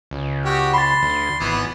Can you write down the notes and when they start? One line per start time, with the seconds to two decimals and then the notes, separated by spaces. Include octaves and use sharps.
0.11 C#2
0.45 F#4 G4
0.74 B5 C6 A6
1.03 D2
1.40 G#1 E3 B3